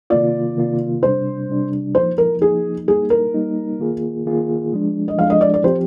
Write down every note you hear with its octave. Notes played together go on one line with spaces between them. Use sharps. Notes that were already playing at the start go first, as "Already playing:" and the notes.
C3 D#3 A#3 F4 D5
C3 D#3 A#3 F4
C3 G3 D4 C5
C3 G3 D4
F3 A#3 D#4 C5
A#4
F3 A#3 D#4 G#4
G3 A#3 D#4 G#4
A#4
G3 A#3 D#4
D#3 A#3 F4 G#4
D#3 A#3 F4 G#4
F3 G#3 D4
D#5
F3 G#3 D4 F5
D#5
D5
D5
F3 C4 G4 C5